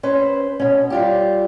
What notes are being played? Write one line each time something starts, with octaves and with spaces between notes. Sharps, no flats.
C#4 B4 C5
B2 C#4
G3 F4 G4